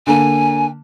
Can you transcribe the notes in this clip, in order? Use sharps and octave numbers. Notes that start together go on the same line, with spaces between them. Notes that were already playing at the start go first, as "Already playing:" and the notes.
D3 A#3 G#5